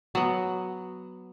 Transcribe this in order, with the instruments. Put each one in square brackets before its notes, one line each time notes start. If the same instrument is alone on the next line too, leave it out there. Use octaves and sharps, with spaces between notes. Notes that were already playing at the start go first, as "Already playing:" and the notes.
[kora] F#3 B3